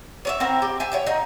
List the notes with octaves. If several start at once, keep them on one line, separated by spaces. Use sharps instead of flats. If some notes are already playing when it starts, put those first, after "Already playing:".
C#5 D5 E5
C4 E4 A#4
G4
C4 E5 G#5
C#5 E5 G5
D#4 D#5